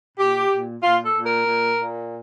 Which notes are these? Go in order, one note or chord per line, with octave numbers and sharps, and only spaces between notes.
A#2 G4
A#2
A#2 F4
A4
A#2
A#4
A#2
A#2